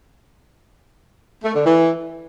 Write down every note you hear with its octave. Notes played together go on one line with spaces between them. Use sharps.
A3
D3
E3